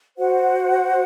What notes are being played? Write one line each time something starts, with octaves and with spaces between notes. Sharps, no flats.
F#4 C5 F#5